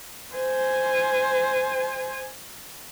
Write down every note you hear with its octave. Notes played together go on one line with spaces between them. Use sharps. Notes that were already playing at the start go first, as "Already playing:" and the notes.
C5 G#5